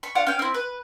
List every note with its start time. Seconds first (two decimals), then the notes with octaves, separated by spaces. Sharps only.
0.03 B5 C#6
0.15 D4 F4 F5 F#5
0.27 C#4 F5 G5
0.39 C4 E4
0.54 B4